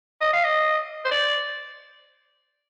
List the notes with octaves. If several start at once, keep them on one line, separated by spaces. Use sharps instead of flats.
D#5
F5
D#5
C5
D5